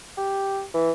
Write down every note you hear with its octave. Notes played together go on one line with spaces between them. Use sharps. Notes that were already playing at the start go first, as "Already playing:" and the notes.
G4
E3